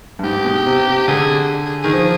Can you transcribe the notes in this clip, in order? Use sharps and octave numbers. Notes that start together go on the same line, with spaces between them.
G2
G#2 G4
B2
C3
C3
D3 G#4
G#4
D#3 G#4
F3